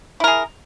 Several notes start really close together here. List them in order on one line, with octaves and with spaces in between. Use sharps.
E4 A#4 G#4